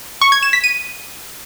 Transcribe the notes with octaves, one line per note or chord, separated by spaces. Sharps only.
C#6
G#6
E7
B6
D#7